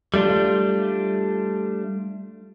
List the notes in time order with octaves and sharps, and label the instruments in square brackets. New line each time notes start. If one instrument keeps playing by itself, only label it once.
[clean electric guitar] G3 A3 D4 F4